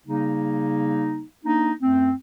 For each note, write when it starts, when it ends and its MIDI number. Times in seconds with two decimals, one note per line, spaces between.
0.06 1.23 49
0.06 1.23 55
0.06 1.23 58
0.06 1.23 63
1.45 1.72 58
1.45 1.72 62
1.45 1.72 63
1.81 2.12 42
1.81 2.12 57
1.81 2.12 60